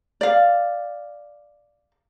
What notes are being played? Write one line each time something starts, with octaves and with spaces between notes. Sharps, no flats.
D5 F5